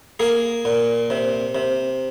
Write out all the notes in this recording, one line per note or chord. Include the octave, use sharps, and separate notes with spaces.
A#3 G#4
A#2
C3
C3